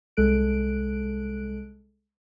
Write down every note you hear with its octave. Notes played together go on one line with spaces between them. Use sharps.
C2 G#3 A4 F#6 D7